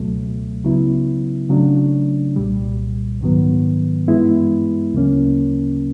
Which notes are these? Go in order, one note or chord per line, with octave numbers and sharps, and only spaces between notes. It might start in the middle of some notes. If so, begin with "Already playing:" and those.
Already playing: C#2 B2 F#3 A3
C#3 F#3 B3 E4
C#3 F#3 A3 D4
C2 A#2 G3
G#2 D#3 F#3 B3
G2 E3 G#3 B3 E4
D2 C#3 F#3 A#3 C#4